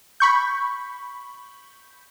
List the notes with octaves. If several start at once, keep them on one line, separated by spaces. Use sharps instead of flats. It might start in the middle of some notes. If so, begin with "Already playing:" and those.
B5 C#6 G6